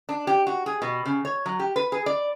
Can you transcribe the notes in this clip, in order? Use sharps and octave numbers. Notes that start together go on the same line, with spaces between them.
D4
G4
F#4
G#4
B2
C#3
C#5
F#3
G4
B4
G#4
D5